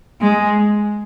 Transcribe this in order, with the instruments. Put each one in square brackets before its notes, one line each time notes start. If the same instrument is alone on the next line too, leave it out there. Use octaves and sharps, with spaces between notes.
[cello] G#3